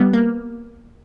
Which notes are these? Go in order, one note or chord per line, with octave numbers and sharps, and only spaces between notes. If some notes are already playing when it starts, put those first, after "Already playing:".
Already playing: G3 B3
A#3